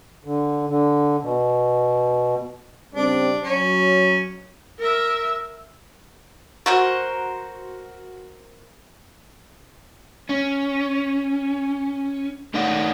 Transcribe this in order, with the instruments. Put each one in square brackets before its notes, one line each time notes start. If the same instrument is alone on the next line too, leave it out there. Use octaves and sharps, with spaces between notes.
[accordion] D3
D3
B2
[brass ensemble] C#3 G3 C4 [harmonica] D4
[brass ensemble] F#3 [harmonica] C#4
[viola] A#4 E5
[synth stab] F#4 [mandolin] A#4 C5 F#5
[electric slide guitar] C#4
A3 D#4 C#5 D5 F#5